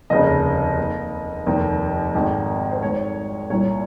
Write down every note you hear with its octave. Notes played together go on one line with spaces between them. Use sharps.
F1 D#2 C#3 D#5
D#2 D#3
F1 D#2 D#3
G#1 G#2 D#3
C5
G#1 G#2 D#3 C#5
C2 A#2 C#5